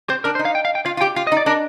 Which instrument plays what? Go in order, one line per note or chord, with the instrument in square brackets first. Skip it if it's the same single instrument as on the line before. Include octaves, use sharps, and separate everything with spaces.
[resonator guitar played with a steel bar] C4 [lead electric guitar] C5
[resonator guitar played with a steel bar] D4 [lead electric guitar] A#4
[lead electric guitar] C5
[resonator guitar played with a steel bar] D#4
[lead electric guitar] F5
G5
F5
G5
[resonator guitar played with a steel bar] F4 [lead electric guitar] F5
[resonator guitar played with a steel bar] F4
[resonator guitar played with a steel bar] G4 [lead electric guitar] G5
[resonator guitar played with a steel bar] F4 [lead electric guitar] F5
[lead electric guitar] D#5
[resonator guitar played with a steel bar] D#4
[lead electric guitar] D5
[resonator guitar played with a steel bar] D4 [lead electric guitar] A#4